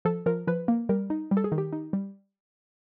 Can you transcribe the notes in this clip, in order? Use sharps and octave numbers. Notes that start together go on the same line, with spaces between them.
F3 A4
F3 A#4
F3 B4
A#3
G3 A#4
D#4
G3
A4
G#4
D#3
G4
D#4
G3